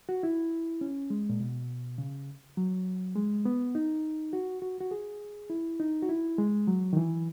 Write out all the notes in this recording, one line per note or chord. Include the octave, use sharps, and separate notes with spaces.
F#4
E4
C#4
G#3
A#2
B2
C#3
F#3
G#3
B3
D#4
F#4
F#4
F#4
G#4
E4
D#4
F#4
E4
G#3
F#3
D#3
E3